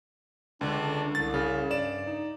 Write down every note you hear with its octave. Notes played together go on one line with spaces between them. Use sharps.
C#2 D3 D4
C2 A6
C#3
G2 D5 E7
D#4